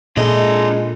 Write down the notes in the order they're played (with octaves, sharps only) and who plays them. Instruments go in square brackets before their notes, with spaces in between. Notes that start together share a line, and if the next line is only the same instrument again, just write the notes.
[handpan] A#2 [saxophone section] G#3 A4 [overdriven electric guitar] D4 D#5